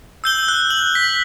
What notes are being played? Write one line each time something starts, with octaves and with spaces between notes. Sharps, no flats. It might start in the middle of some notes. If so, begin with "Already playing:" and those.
E6 G6 G7
F#6
F#7
B6